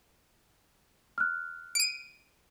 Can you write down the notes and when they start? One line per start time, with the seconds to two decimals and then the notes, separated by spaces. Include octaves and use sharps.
1.18 F6 F#6
1.75 D7 D#7